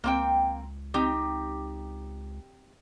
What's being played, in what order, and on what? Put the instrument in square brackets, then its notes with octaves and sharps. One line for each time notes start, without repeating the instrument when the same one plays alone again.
[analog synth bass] C#2 [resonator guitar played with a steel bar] A#3 C4 G5
[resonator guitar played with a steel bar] C4 D#4 G4